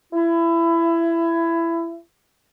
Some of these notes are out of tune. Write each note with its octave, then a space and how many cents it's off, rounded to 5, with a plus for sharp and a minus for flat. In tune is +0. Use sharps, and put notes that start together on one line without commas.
E4 +20